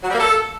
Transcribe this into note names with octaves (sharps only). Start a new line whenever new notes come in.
F#3
G3
A#3
A4